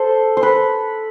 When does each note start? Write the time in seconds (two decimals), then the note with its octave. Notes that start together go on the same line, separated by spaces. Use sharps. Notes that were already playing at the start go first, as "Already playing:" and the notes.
Already playing: A4 C5
0.37 C5
0.43 B4